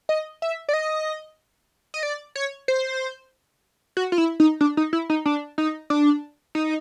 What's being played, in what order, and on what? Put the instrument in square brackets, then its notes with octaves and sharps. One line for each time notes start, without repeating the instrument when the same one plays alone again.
[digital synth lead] D#5
E5
D5
D#5
D#5
D5
C#5
C5
F#4
F4
E4
D#4
D4
D#4
E4
D#4
D4
D#4
D4
D#4